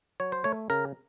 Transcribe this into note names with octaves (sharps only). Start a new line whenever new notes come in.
F#3 C#5
C5
A3 C#5
C#3 A#4